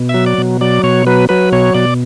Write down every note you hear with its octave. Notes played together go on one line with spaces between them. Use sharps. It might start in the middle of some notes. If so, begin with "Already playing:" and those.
Already playing: B2
F#3 E5
D5
B2
F#3 D5
B2 C#5
F#3 B4
F#3 B4
B2 C#5
B2 D5